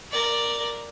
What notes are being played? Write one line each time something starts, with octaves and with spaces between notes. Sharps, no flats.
A#4 D5